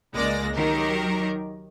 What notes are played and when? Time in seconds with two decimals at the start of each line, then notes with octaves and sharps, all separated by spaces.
0.14 C#2 G#3 A#3 D5 A#6
0.55 D#3 F#3 G4 A#4